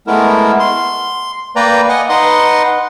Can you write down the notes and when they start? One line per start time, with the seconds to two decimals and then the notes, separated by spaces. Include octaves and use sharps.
0.07 G#3 A3 B3 E4 A#4
0.59 C6
1.56 A#3 B4 D5 G5 A#5
1.89 D#5 F#5 G#5
2.09 D#4 B4 D#5 F#5 C6